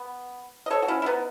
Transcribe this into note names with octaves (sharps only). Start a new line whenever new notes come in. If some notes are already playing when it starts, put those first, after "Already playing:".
Already playing: B3
D#5
A4 C#5
F#4
C#4 E4
E4
B3 D#4